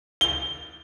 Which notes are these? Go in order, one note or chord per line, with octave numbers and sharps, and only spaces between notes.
G7